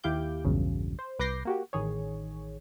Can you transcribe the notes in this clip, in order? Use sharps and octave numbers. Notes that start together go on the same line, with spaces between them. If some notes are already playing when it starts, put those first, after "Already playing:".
D#2 E4 G4 F5 D6 G6
A#1 E2 G2 C#3 F#3
C5
C2 B4 D6 G6 A#6 C7
A#3 F#4 G4
A1 D#3 G#4 C#5